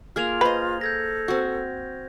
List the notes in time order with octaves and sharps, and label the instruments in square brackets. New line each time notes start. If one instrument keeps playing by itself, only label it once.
[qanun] A#3 G#4 [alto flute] F4 [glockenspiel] F6 G#6 F7
[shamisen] B4 [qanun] C5 D#5
[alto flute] A4 [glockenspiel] G6 G#6 A#6
[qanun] C4 F#4